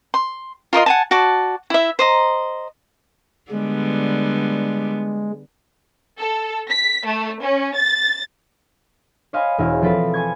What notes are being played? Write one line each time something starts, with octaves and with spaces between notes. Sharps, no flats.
C6
F4 A#4 D#5 C6
F#5 G#5 A5
F#4 D5 A5
E4 E5
C5 D#5 A#5
D3 G3 G#3 B3
A4
B6
A3
C#4
A6
C5 C#5 D#5 F5 G#5 B5
E1 E4 F5
F3 C4 F4 A4 B4
G#5 C#6 G#6